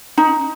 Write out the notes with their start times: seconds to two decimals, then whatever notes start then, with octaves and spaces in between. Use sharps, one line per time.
0.18 D#4